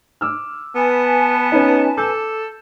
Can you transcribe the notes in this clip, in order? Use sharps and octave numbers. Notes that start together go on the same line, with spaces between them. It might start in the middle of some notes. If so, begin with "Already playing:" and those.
D6 E6 F6
B3 B4 G#5 A5
C#4 D#4
A4 D6 E6 G6